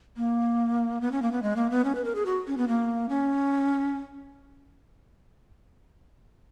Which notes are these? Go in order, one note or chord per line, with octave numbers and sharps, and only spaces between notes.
A#3
B3
C#4
A#3
B3
G#3
A#3
B3
C#4
B4
A#4
G#4
F#4
C#4
B3
A#3
C#4